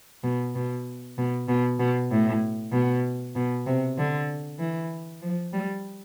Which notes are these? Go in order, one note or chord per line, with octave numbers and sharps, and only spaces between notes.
B2
B2
B2
B2
B2
A2
B2
B2
C3
D3
E3
F3
G3